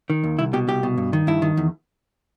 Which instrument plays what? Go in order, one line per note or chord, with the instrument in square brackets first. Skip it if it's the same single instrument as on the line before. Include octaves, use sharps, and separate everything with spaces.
[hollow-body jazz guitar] D#3
D#2
C2 E4
B2 G4
C2 G4
B2
G2
D#3
G2 E4
D#3
E2